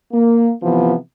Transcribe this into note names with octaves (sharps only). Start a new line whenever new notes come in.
A#3
C3 E3 F3 B3